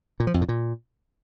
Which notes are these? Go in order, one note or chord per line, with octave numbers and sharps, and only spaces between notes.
A#2
F3
F2
A2
A#2